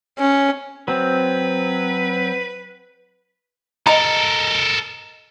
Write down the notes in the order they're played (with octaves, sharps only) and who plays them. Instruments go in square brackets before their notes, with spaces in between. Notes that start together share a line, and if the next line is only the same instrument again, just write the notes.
[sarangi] C#4
[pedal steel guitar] F#3 C4 [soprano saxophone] B4
[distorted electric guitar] A4 A#4 [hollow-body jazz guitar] D#5 A#5